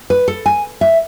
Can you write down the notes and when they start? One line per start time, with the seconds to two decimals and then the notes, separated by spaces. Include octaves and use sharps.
0.10 B4
0.28 A4
0.46 G#5
0.81 E5